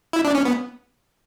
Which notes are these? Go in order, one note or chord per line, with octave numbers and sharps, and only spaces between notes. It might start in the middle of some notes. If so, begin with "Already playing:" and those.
E4
D4
C#4
B3